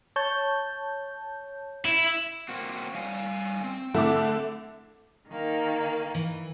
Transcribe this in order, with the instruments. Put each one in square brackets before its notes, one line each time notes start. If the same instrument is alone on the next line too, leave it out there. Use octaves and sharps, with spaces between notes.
[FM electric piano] C#5 A5 G6
[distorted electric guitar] E4
[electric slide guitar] A#3 C4 F#4
G3 F5 G#5
C4
[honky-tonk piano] D3 E4 D6 [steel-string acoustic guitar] A3
[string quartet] D#3 A#3
[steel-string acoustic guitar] E3